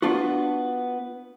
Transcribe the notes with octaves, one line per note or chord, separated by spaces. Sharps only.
B3 D4 F4 F#4